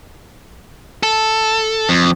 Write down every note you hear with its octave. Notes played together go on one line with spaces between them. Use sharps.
A4
F2